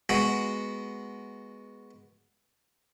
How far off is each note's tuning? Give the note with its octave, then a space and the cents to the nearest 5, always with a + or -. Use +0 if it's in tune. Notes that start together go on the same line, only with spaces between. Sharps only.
G#3 +0 B3 +0 F#4 +0